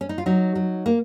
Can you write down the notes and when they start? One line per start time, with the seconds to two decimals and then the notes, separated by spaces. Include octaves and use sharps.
0.01 C#4
0.09 D#4
0.18 F4
0.26 F#3 D#4 F#4
0.55 F#3
0.86 A#3